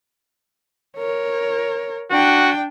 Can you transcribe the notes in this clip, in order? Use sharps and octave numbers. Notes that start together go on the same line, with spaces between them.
A#4 C#5
D4 F#4 G5